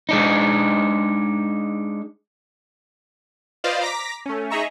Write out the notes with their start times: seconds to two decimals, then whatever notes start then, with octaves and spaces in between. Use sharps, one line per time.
0.09 G#3 D4 D#4
3.64 F4 B4 C5 D5 D#5 F5
3.82 A#5 D6 A#6 B6
4.26 A3 C#4
4.50 D#4 G#4 D#5 E5 A#5 C#6